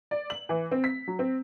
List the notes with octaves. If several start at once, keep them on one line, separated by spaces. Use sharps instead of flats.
D5
F#7
E3
C4
B6
F#3
C4